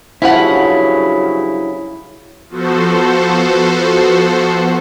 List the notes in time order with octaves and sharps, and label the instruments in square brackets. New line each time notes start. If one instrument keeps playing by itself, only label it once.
[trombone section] G2 C#3 F#3 [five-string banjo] F3 C#4 F#5 [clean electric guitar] E4
[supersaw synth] F3 B3 F#4 A4 C5